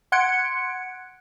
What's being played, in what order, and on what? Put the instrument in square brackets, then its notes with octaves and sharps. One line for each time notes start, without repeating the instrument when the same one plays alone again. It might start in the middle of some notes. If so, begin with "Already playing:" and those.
[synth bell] F#5 C6 F#6 G#6 C#7 D7